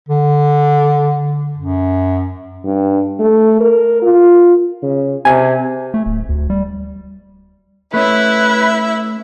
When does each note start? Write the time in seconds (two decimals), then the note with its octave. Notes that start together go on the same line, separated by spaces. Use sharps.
0.08 D3
1.57 F#2
2.65 G2
3.20 A3
3.60 A#4
4.02 F4
4.83 C#3
5.25 C3 G#5
5.94 A3
6.06 D1
6.29 D2
6.50 G3
7.94 A3 C#4 E4 B4 E5